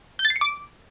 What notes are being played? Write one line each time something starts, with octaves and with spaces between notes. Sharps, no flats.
G6
A6
C7
C#7
D6